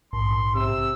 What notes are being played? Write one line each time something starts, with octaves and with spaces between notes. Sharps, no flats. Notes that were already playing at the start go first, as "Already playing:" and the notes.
A#1 G#2 C6
C3 E6